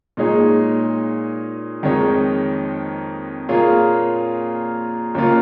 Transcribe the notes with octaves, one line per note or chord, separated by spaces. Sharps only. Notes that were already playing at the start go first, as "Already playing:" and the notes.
A#2 G#3 D#4 G#4 C#5
F2 D#3 G#3 D#4 C#5
A#2 A#3 F4 G#4 C#5
D#2 C#3 A#3 F4